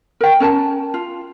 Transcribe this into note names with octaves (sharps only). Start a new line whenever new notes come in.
A#4 G5
C#4 A#4 A5
F4